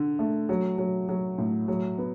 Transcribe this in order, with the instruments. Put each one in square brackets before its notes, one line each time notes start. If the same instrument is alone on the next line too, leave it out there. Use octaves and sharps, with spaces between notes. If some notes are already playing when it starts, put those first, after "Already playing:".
Already playing: [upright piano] D3
A3
F#3
F#3
F#3
A2
F#3
B3